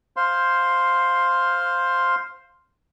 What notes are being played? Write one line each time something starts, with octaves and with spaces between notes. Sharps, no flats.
C5 F5 C6